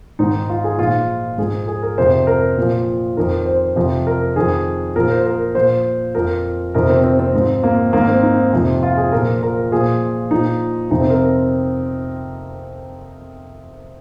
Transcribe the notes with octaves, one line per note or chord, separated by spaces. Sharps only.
G#2 D#3 D#4
F4
G#4
A#2 F3 F4
G#2 F3 G#4
G#4
A#4
F2 C3 F3 C5
A#4
A#2
F3
F2 D#3 A#4
C5
F2 C3 F3
A#4
F2 D#3 G#4
A#2 F3 A#4
C5
A#4
A#2 F3 C5
F2 F3 A#4
F2 C3 D#3 A#4
C4
C4
C4
G#2 F3
A#3
G#2 D#3 A#3
C4
D#4
F2 C3 F3
F4
G#4
A#2 F3 A#4
A#4
A#2 F3 G#4
A#2 F3 D#4
F2 C3 F3 D#4
C4
A#4